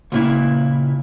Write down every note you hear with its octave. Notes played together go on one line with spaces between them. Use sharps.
C#2 A#2 E4